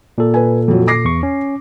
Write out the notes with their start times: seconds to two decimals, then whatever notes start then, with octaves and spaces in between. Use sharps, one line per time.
0.18 A#2 A4
0.34 B4 G#5
0.68 F2 F#3
0.87 D6 A#6 C7
1.05 E2 C#6
1.23 C#4